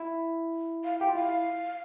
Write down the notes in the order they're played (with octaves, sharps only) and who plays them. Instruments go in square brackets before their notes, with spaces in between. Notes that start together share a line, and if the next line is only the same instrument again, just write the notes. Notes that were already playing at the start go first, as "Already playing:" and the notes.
Already playing: [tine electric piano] E4
[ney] F5
[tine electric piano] G4 [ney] G5
[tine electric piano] F4
[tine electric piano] E4 [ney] F5